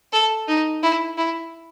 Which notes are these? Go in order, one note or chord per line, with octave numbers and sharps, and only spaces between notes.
A4
D#4
E4
E4